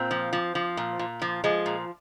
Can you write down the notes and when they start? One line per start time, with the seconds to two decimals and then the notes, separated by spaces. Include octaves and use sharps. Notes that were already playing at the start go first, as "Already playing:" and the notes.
Already playing: A#2 C4
0.11 F3
0.33 F3
0.55 F3
0.77 A#2
0.99 A#2
1.22 F3
1.44 F3 G#3
1.66 A#2